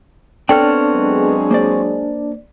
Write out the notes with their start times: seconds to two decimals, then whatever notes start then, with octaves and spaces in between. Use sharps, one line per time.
0.49 B3 C4 D4 A4 C#5 G5 F6
0.94 F#3 G#3 G#4
1.51 A#3 C5 D5